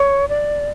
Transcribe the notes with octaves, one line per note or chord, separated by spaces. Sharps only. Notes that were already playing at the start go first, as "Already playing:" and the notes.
Already playing: C#5
D5